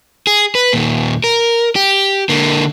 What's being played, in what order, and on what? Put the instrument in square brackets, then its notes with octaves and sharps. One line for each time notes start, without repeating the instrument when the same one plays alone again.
[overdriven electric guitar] G#4
B4
D#2 A#2
A#4
G4
D3 A#3